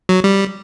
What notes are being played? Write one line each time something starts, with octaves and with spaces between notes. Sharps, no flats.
F#3
G3